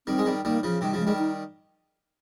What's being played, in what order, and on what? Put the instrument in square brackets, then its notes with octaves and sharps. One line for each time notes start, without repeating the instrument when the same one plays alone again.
[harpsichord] D#3 G3 [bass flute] C4
[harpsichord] G#3
D#3 G3
[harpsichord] D#3 G3 [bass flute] A#3
[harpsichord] C#3 F3
[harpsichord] C3 D#3 [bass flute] G3
[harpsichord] C#3 F3
[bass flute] G#3
[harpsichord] D#3 G3
[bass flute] D#4